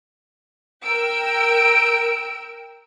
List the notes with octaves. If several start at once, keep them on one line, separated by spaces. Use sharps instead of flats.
A#4 G5 E6 D7